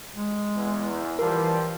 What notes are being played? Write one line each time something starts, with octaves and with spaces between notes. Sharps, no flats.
G#3
E2
E3 F3 G3 A#4